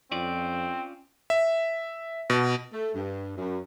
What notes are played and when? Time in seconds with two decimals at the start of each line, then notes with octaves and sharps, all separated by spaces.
0.12 F2 C4 C#4 F4 D5
1.30 E5
2.30 B2
2.73 A3
2.94 G2
3.37 F#2